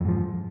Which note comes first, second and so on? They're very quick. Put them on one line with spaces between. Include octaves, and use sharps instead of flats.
F2 G#2 F3